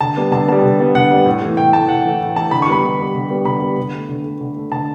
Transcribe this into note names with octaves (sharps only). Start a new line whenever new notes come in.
D3 A5
G3 B3
D3 A5
G3 B3 A5
D3
G3 B3
D3 F#5
G3 B3
A2
E3 A3
A2 G5
E3 A3 A5
A2 F#5
E3 A3
A2
E3 A3 A5
D3 B5
C#6
G3 B3 B5
D3 C#6
G3 B3
D3
G3 B3
D3 B5
G3 B3
D3
A3
D3
A3
D3
A3
D3 A5